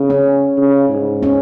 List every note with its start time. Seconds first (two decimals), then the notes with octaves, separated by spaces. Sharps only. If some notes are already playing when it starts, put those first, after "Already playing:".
Already playing: C#3
0.10 C#4
0.58 C#3
0.89 G#2
1.23 C#4